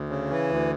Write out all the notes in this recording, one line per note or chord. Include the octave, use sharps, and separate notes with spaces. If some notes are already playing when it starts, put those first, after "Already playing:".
Already playing: D2
C#3
E3
D2